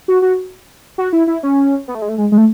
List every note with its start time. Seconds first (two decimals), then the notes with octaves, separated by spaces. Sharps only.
0.08 F#4
0.22 F#4
0.98 F#4
1.13 E4
1.27 E4
1.43 C#4
1.88 B3
1.95 A3
2.02 G#3
2.09 A3
2.18 G#3
2.32 G#3
2.38 A3